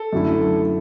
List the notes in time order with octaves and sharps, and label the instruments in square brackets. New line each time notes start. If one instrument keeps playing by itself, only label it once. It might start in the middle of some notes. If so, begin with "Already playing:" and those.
Already playing: [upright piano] A4
[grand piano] F#2 D3 A3 E4